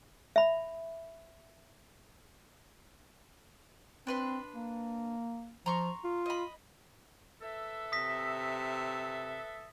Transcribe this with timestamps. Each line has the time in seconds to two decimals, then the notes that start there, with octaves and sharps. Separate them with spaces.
0.36 E5 B5
4.07 C4 D4 B4 C6
4.53 A#3
5.66 F3 A#5 C6 C#6
6.04 F4
6.26 D#5 B5
7.42 A4 B4 E5
7.92 C3 D#6 A#6 B6